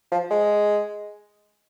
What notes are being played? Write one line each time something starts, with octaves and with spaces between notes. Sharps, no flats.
F3
G#3